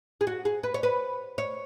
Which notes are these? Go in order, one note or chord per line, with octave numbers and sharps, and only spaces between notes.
G#4
F#4
G#4
B4
C#5
B4
C#5